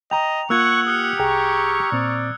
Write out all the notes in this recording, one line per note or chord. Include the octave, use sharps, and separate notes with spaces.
D#5 G5 A#5 F7
A#3 F4 F#5 C#6 E6 F#6 G#6
G4 D#6 F6 C#7
C2 G#4 G5 A#5 C#6
A#2 C4 D5